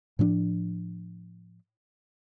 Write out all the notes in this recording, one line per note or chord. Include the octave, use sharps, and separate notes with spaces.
A2 F3 C4 D4